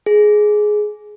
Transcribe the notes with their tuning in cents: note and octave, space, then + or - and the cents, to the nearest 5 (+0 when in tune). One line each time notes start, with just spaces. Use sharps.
G#4 +15